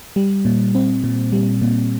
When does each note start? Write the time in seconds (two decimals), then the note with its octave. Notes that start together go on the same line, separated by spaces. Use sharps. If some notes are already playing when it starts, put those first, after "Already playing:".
0.16 G3
0.45 A#2
0.75 C4
1.04 A#2
1.32 G3
1.62 A#2